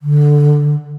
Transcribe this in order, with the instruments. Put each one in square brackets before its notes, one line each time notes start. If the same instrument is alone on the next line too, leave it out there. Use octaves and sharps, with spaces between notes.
[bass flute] D3